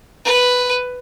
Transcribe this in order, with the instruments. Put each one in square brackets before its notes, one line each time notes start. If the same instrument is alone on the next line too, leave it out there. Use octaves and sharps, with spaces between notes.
[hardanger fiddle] B4